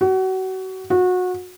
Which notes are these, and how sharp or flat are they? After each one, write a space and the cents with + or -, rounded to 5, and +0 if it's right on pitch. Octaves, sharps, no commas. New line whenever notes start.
F#4 +30
F#4 -25